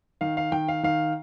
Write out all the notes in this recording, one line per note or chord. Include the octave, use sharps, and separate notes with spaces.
D#3 F5
F5
D#3 G5
F5
D#3 F5